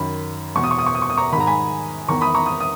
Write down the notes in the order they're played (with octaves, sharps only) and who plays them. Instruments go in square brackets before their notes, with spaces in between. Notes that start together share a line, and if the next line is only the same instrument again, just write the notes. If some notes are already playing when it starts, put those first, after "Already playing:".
Already playing: [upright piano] F#2 D#3 B5
E2 B2 C#6
D#6
C#6
D#6
C#6
D#6
C#6
D#6
A#5 C#6
D#3 B5
G#2 A#5
G#5 B5
E2 D#3 A#5 C#6
B5 D#6
A#5 C#6
D#6
D#6